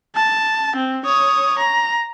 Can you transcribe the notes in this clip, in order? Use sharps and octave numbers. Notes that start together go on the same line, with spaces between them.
A5
C4
C#5 D#6
A#5